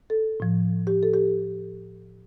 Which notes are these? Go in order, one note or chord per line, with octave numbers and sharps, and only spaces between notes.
A4
A2 F3
G4
A4
G4